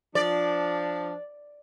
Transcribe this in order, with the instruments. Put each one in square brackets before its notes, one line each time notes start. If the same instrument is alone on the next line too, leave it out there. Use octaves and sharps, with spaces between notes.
[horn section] F3 D4 [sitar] D5